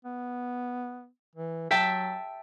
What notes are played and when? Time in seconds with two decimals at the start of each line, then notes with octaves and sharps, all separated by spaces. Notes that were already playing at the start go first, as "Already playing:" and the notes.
0.05 B3
1.35 E3
1.71 F#3 E5 G5 A5